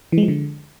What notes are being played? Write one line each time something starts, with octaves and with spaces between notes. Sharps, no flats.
E3
G#3
F3
D3